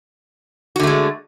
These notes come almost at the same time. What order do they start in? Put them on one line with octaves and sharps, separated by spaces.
F#4 D3 A3 G#3